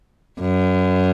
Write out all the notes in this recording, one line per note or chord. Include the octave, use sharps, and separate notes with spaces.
F#2